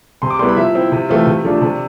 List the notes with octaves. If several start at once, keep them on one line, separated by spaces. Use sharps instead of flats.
C3 C6
D6
G3 B3 E4 C6
B5
F3 E5
C4 E4
C3
E3 A3 C4 F4
C3
F3 A3 D4
C3 D5